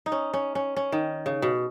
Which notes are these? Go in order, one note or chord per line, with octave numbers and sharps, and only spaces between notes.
D#4
C#4
C#4
C#4
C#4
D#3
C#3
B2